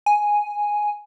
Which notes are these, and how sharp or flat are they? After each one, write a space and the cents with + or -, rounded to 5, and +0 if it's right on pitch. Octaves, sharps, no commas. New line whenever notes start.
G#5 +0